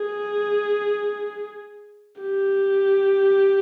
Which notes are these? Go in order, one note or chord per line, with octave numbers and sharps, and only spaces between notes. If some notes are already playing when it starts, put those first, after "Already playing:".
Already playing: G#4
G4